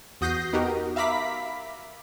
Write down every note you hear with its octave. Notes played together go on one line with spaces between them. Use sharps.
E2 F#4 D#6 G6 A#6 C7
B3 D#4 F#4 G4 A#4
E5 F5 A#5 B5 D6 B6